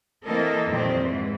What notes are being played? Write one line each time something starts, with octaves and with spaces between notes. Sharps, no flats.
E3 A#3 C4 A4 A#4 D#5
F2 A#2 D#3 G3 C4
G#2 E3